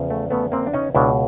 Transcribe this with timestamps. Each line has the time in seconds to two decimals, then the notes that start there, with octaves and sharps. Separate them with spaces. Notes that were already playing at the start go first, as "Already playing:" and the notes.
Already playing: E2 C#3 F3
0.10 A3
0.31 A3 B3
0.52 A#3 C4
0.67 D4
0.74 C#4 D#4
0.95 C#2 B2 D4 E4